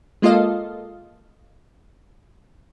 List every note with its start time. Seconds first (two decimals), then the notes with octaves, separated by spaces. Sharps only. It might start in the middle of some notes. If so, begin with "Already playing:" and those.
0.22 G#3 A#3 F4 A4 D#5 F5